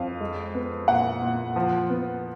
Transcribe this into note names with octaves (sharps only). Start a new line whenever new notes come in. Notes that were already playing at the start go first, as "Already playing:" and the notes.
Already playing: F2 F5
G#3
B3
A#2 F#5
A#2
F3
B3